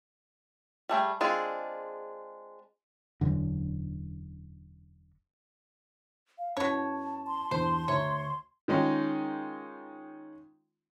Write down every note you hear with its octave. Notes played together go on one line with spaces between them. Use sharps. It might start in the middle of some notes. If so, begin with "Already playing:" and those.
G3 A3 G#4 G5
G#3 C4 D4 F4 G#4
E1 F#2 D3
F5
F#2 B2 E4 C#5 A5
C6
E2 G2 C5
D2 C#5 E5 A#5
D#3 G#3 C#4 D#4 F4